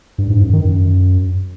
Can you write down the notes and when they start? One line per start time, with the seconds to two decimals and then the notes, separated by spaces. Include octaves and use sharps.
0.18 G2
0.30 G#2
0.41 F#2
0.53 D#3
0.65 F#2